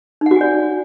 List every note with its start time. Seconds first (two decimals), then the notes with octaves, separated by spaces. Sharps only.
0.21 D#4
0.26 F#5
0.31 F#4
0.36 G#5
0.41 D5